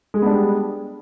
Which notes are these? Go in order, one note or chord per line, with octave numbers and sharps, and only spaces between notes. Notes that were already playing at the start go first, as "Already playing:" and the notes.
G3 G#3 B3 D4 G#4